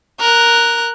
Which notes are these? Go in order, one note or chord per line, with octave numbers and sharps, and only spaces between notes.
A#4 F#6